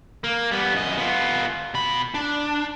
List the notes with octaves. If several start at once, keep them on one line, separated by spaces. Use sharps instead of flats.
A#3
G3 B3
F#2 D#5
B3 F4
B2 B5
D4